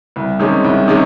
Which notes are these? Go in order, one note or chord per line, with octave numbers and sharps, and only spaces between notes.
C2
C3 D#3 G#3 C#4
C2
C3 D#3 G#3 C#4